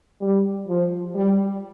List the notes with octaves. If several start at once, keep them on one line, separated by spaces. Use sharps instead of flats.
G3
F3
G3